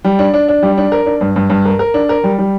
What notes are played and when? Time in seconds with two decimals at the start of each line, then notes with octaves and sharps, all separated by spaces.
0.04 G3
0.19 D4
0.33 D4
0.48 D4
0.63 G3
0.78 D4
0.92 A#4
1.06 D4
1.21 G2
1.36 G2
1.50 G2
1.65 A#4
1.79 A#4
1.94 D4
2.09 A#4
2.24 G3
2.38 G3